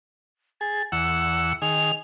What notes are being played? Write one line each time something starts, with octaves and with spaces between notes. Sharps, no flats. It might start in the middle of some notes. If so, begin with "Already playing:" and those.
G#4 A6
E2 F#5 E6 C#7
D#3 G#4 F7